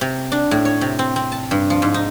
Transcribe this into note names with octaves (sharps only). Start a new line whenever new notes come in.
C3
D4
A2
C#5
C3
C4
C4
A5
G2
F3
G#2
D#4